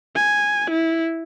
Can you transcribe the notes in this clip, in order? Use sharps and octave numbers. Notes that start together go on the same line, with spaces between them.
G#5
E4